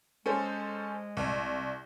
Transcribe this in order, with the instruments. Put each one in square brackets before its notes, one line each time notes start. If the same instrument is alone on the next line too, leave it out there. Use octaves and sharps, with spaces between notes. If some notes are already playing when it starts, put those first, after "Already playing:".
[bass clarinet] G#3 [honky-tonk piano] C#4 A4 C5
[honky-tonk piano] C2